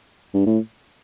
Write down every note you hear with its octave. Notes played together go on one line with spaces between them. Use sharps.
G2
A2